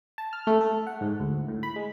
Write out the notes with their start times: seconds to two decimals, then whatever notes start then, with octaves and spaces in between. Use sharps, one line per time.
0.18 A5
0.33 F6
0.47 A3
0.61 A4
0.87 F#5
1.01 G#2
1.20 D2
1.48 A2
1.63 B5
1.76 G#3